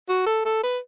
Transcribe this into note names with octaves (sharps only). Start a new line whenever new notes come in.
F#4
A4
A4
B4